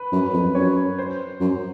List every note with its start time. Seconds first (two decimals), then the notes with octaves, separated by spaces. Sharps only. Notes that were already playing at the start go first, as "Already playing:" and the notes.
Already playing: B4
0.12 F#2
0.33 F2
0.55 F#2 C#5
0.98 C5
1.40 F#2